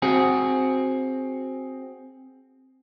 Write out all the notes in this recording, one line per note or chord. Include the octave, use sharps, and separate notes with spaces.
C4 F#4 G#4